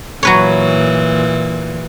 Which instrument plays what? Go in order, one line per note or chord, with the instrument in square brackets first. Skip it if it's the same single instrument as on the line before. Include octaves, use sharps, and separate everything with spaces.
[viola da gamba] A#2 E3 [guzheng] F#3 B4 C#5